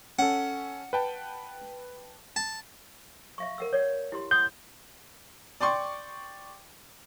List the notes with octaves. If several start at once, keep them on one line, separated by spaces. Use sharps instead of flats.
C#4 A4 F#5
B4 G5 A5
A5
E5 F5 C#6
A#4 F#5 E6
C#5 D5 F#5
E4 G4 C6
F#5 C6 D#6 G6
D5 G5 C6 C#6